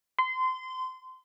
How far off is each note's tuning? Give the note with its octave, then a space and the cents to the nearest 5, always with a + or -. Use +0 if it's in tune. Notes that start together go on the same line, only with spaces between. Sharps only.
C6 -25